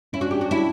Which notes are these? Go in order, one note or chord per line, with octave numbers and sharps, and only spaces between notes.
C#4 E4
D4 F#4
D4 G4
F#4
D4 E4